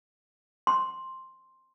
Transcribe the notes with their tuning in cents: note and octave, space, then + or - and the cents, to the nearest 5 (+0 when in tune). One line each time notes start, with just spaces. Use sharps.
C6 +5